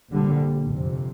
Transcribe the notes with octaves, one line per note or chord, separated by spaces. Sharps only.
A#1 A#2 D3 G3
G1 F2 C3